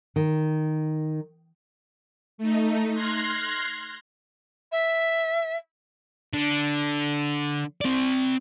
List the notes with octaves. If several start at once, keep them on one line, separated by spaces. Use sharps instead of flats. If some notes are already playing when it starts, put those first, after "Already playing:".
D#3
A3 D#4
C6 F6 F#6 G#6 A#6 C7
E5
D3
C4 D5